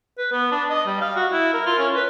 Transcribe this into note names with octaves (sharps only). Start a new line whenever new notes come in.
B4
B3
D4
D#5
G3
F5
F#4
E4
A#4
F4
C#4
B4